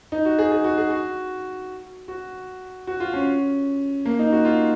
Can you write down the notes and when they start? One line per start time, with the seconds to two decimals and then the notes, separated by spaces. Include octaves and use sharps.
0.12 D#4
0.25 F#4
0.39 G#4
0.52 G#4
0.64 F#4
0.78 G#4
0.91 F#4
2.08 F#4
2.87 F#4
3.00 F4
3.13 C#4
4.05 A#3
4.19 D#4
4.32 F#4
4.45 F4